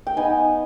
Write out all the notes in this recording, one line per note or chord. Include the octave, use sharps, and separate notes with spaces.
G5
B3 D#4 G#5